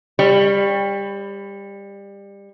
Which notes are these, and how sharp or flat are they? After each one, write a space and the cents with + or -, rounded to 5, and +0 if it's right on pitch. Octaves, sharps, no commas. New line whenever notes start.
G3 +25 C#5 -5